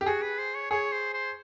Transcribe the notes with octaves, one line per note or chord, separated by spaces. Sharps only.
G4
F#4 G#4
B4
C5
C#5
G#4 C#5
C5
C5